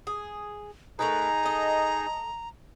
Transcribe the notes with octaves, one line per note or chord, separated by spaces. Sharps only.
G#4
A3 D#4 G#4 A#4 B4 A#5
A4 D#5